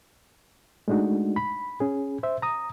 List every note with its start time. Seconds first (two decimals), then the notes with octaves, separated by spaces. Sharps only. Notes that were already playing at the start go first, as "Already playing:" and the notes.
0.88 G#3 A3 D4 D#4 F#4
1.36 B5
1.80 C#4 G#4
2.23 C5 E5
2.42 A#5 D#6